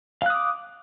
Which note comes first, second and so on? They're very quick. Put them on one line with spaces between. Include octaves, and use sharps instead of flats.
F5 F#6 D#6 D6